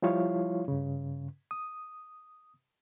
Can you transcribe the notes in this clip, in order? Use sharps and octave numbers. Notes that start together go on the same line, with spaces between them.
F3 G3 E4 F4 C#5 F5
G2 C#3
D#6